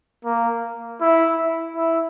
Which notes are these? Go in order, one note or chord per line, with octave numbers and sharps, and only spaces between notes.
A#3
E4
E4